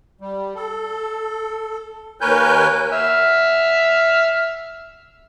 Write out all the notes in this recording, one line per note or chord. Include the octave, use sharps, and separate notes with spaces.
G3
A4
D#2 A#4 B4 C#5 G#5 G6
E5 F6